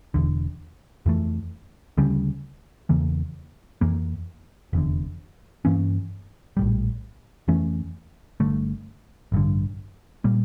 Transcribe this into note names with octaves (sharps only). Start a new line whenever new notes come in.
E1 E2 D3
F2 E3 A3
D2 C#3 G3 C#4
E2 C#3 E3 A#3
F2 E3 A#3
F1 E2 D3
G2 E3 A#3 C#4
A#1 A2 G3
F2 E3 A3 C#4
G1 G2 D3 A3
A1 G2 D3
A#2 G3 A#3